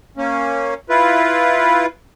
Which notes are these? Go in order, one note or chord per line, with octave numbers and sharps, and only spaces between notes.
A#3 C#4
E4 F4 B4